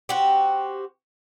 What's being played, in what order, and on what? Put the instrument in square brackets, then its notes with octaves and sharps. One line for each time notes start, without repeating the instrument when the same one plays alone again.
[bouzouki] C4 F#4 G4